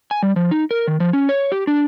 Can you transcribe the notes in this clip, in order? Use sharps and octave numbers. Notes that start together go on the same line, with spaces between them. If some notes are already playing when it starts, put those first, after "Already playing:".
G#5
G3
F3
D#4
A#4
D#3
F3
C#4
C#5
G4
D4